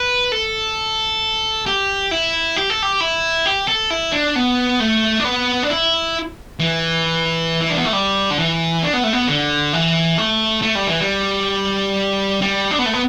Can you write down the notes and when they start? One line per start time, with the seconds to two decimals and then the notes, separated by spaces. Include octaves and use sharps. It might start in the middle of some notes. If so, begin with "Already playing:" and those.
Already playing: B4
0.32 A4
1.66 G4
2.11 E4
2.56 G4
2.70 A4
2.83 G4
3.00 E4
3.46 G4
3.68 A4
3.90 E4
4.12 D4
4.36 B3
4.80 A3
5.20 D4
5.25 B3
5.63 D4
5.70 E4
6.60 E3
7.61 E4
7.70 D4
7.77 B3
7.85 A3
7.93 G3
8.31 D3
8.38 E3
8.83 D4
8.93 B3
9.04 A3
9.13 B3
9.28 D3
9.73 E3
10.18 A3
10.62 A3
10.75 G3
10.87 E3
11.00 G3
12.42 G3
12.71 D4
12.79 B3
12.86 A3
12.93 B3